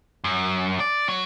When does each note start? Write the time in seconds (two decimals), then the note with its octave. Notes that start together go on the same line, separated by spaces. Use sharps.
0.24 F#2
0.80 D5
1.09 F#3